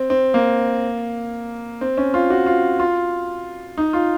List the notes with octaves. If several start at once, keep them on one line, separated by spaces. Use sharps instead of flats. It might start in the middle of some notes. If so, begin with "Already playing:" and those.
Already playing: C4
C4
A#3
C4
C#4
F4
F#4
F4
F4
D#4
F4